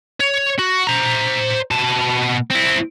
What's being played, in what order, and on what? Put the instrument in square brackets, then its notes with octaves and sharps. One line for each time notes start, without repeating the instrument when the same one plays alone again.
[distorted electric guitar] C#5
F#4
C5 A#5
B2 A5
C4 E4